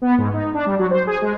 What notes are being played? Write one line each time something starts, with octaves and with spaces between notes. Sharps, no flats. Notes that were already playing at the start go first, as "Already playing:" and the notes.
B3
G#2
D#4
D4
G3
F#3
C5
G#4
G#3